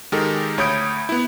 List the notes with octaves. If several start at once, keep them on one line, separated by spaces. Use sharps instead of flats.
D#3 G#3 D#4 G4 A4 A#4
D2 C#5 B5 D#6 G6 D7
B3 E4